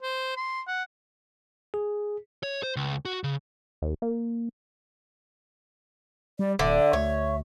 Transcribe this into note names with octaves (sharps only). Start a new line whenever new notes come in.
C5
C6
F#5
G#4
C#5
C5
C#2
F#4
C#3
D#2
A#3
G3 D5
D1 D3 E5
D2 C#5